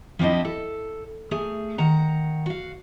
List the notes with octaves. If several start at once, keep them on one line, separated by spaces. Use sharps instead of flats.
F3 C4 D4 E4 D#5
A4
A3 G#4
D#3 F#5 A#5
F#4 F5